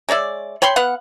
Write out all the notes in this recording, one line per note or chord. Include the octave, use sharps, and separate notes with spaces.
G#3 C#5 D5 E5
C#5 G5 B5 C6
B3 F5 F#5